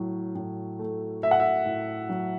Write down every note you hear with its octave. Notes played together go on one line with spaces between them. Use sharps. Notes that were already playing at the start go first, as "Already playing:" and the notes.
Already playing: A2 F#3
A2
A3
A3 E5
F#5
E5
A2
F#3